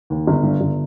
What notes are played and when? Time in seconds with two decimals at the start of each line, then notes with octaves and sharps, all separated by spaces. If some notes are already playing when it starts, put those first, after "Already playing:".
0.10 D#2
0.27 G1
0.43 G2
0.61 G1